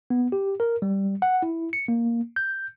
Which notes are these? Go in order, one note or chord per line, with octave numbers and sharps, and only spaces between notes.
B3
G4
A#4
G3
F#5
E4
C#7
A#3
G6